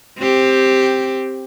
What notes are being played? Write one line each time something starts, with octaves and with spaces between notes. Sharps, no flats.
C4 G4